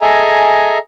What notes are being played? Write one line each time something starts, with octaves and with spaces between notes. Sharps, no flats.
G#4 A4 D#5 E5 G#5 A#5